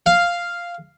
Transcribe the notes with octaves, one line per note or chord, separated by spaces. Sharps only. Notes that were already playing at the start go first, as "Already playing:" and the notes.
F5